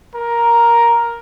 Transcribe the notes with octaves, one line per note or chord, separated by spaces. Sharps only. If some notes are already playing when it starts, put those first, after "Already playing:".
A#4